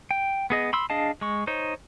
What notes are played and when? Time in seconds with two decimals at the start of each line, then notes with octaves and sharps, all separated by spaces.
0.11 G5
0.50 B3 G#4 D#5
0.73 B5 C6 E6
0.90 D4 G#4 D#5 F5 A5
1.21 G#3 C#6
1.47 D#4 C5 C#5